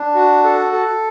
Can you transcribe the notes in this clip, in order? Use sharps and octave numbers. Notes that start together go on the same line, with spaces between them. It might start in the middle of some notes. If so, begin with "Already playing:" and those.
Already playing: D4
F#4
A4
A4